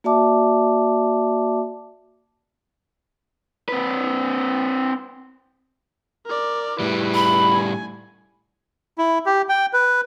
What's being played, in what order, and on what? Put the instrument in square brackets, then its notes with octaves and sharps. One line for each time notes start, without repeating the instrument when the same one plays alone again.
[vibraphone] A#3 F#4 D5 E5 A5 D6
[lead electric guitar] C4 B4
[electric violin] A#4 D5
[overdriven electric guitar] A2 G3 [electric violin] E4 B4
[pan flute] B5
[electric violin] G#5
[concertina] E4
G4
G5
B4